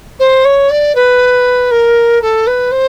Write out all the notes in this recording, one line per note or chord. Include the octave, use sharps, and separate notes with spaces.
C5
C#5
D5
B4
A#4
A4
B4
C5